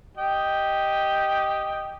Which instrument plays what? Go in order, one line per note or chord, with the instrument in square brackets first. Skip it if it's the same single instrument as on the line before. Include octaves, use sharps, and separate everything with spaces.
[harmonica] G4 D#5 G5